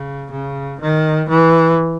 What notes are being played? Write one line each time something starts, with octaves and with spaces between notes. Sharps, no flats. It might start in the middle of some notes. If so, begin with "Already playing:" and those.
Already playing: C#3
C#3
D#3
E3